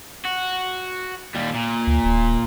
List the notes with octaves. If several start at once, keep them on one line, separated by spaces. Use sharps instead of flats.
F#4
D#2 G3
A#2
D2
D1